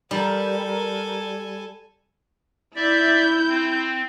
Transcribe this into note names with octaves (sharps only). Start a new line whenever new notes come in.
G3 A4 A#4 G#5
E4 D5 E5 G6
C4